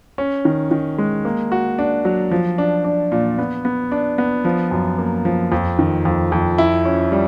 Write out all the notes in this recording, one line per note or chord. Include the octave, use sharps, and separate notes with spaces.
C#4
D#3
D#3
G#3
A#3
F#4
D4
F#3
F3
D4
D4
A#2
B3
B3
D4
B3
F3
F#2
A#3
F3
F2
D#3
F2
F2
E4
C#4
G3